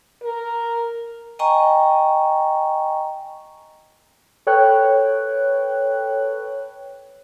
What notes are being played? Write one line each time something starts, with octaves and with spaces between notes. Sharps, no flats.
A#4
D#5 G5 G#5 A#5 C#6
A4 B4 C#5 G5 F#6